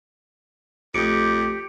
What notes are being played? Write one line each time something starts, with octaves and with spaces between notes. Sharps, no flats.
A#1 F2 A3 G4 D6 D#6 C#7 D7